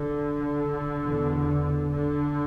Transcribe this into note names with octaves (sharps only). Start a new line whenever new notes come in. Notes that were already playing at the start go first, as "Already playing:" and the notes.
Already playing: D3
E2 B2
D3